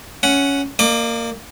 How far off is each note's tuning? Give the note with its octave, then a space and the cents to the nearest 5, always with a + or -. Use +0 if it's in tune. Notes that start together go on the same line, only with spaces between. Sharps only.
C#4 +10 F#5 +0
A#3 -15 D5 +45 D6 +0